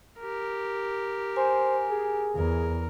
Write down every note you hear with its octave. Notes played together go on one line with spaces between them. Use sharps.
G4 A#4
C5 G#5
G#4
E2 A#4